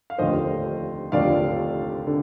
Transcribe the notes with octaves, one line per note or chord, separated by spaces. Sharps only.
F5
F1 D#2 D3 F3 C5 D#5
F1 D#2 D3 F3 D5 F5
D3